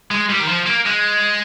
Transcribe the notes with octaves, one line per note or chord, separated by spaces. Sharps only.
G#3
G3
D#3
F3
A#3
G#3